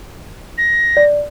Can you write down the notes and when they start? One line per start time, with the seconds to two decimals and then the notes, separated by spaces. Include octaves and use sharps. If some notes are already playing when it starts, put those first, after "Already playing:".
0.57 A#6
0.97 D5